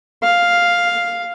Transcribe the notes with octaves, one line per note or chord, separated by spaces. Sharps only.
F5